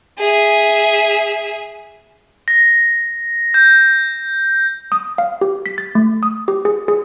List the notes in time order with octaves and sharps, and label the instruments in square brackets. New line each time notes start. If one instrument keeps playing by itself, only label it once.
[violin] G#4 E5
[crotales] A#6
G6
[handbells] D#6
F5
G4
B6
A6
A3
D#6
G4
G#4
G#4